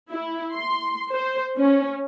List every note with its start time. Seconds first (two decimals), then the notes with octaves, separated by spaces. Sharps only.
0.11 E4
0.55 C6
1.13 C5
1.58 C#4